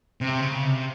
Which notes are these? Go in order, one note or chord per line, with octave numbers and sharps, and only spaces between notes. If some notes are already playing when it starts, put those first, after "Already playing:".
C3
C#3
C3